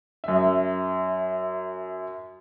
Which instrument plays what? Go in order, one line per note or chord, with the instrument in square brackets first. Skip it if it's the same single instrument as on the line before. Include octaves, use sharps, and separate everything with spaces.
[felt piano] F#2 E5